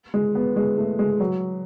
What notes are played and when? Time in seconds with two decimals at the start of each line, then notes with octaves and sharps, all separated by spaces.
0.14 G#3
0.35 B3
0.56 G#3
0.78 A3
0.99 G#3
1.20 F#3